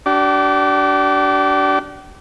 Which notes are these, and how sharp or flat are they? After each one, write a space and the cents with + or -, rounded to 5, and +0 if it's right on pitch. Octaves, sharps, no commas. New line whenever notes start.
D4 -15 G4 -45